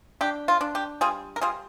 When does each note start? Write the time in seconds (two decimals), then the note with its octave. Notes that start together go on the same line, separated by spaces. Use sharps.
0.21 D4 G4
0.48 F4
0.61 D4
0.75 G4
1.01 G3 F4 G#4
1.36 A#4
1.41 G3 F4 G#4